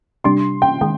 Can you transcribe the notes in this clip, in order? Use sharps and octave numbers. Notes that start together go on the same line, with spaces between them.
C3 G3 D4 G4 C6
G5
D#3 G#3 G5